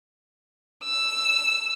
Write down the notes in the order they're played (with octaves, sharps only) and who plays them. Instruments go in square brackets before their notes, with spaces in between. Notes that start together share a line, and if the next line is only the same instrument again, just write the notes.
[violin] E6